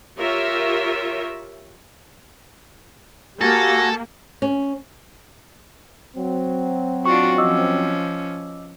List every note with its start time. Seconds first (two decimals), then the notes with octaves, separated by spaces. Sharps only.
0.18 F4 G4 A#4 C#5 E5
3.41 A#3 F#4 G4 A4 G#5 A#6
4.42 C#4
6.16 F#3 C4
7.06 D4 F4 F#4 C#6
7.38 F3 C#4 D#5 D6 E6